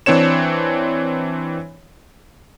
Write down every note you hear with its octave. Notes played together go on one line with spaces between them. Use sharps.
E3 C4 D4 C#5 E7